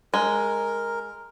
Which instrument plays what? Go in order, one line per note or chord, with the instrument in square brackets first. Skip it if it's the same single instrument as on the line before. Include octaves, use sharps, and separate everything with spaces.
[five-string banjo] G#3 [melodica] A#4